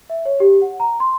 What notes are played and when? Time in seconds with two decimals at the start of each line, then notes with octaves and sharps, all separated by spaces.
0.10 E5
0.25 C#5
0.40 G4
0.62 F#5
0.80 A#5
1.00 C6